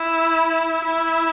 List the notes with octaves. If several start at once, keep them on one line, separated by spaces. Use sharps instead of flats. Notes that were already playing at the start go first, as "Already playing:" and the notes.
Already playing: E4
E4